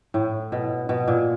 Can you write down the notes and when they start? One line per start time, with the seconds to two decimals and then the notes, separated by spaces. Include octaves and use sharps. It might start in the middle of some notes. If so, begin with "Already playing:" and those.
0.14 A2
0.52 B2
0.89 B2
1.08 A#2